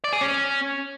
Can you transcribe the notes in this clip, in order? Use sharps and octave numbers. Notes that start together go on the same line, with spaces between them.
D5
G#4
C#4